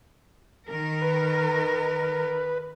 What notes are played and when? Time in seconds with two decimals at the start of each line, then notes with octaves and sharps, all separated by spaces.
0.68 D#3 A#4
1.02 B4